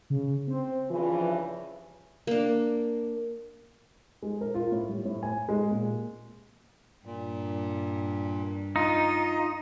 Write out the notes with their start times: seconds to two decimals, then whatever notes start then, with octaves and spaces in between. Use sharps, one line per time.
0.10 C#3
0.48 C4 C5
0.90 G2 C#3 E3 F3
2.27 A#3 D4
4.23 G#3
4.41 A#4
4.54 F4
4.72 A2
4.89 G3
5.05 A2
5.23 G#5
5.49 G#3
5.71 A#2
7.05 G2 A#2
8.76 D#4 F4